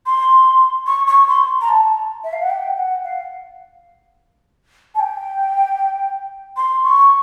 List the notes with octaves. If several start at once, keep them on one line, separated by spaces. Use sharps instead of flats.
C6
C#6
C#6
C6
A#5
A5
E5
F5
F#5
G5
F#5
F5
A5
G5
C6
C#6